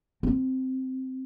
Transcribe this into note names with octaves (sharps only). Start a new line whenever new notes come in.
C4